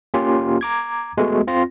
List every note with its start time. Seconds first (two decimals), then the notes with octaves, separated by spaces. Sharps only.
0.14 A#3 C#4 F4 G4
0.61 A#5 D6 G#6
1.18 G#3 A3 B3 F#4
1.47 C4 F4 A#6